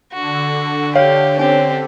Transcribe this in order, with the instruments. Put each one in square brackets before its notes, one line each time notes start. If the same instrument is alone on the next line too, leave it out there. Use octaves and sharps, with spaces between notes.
[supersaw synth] D3 [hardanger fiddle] F#4
[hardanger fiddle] G4 [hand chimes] C#5 [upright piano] F5
[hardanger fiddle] C4 G4 [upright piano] C#4